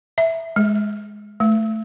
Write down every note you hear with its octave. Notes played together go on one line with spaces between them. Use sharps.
E5
G#3
A3